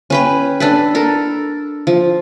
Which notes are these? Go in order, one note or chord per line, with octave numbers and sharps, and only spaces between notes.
C#4 B4 G5
D4 A4 B4
A4 A#4
F3